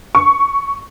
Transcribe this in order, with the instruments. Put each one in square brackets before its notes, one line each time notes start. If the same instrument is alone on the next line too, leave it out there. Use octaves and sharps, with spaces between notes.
[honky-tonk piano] C#6